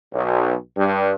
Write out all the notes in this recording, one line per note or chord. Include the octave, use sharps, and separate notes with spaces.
B1
G2